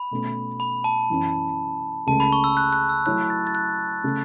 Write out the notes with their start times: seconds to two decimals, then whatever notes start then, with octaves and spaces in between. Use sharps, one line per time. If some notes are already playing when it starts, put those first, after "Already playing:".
Already playing: B5
0.11 B2 A3 C#4
0.60 B5
0.84 A5
1.10 F#2 E3 C#4
2.07 C#2 C#3 A3 A5
2.20 B5
2.32 C#6
2.44 E6
2.57 F#6
2.73 F#6
2.89 E6
3.06 F#3 A3 E4 C#5 F#6
3.30 A6
3.47 A6
3.55 F#6
4.04 C#3 A3 C#4